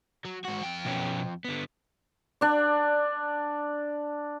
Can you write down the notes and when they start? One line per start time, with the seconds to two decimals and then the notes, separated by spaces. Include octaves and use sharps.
0.25 F#3
0.45 G#2 F#4
0.63 F2 G5
0.85 B2 B3 C#4
1.45 D3 B3
2.41 D4 D5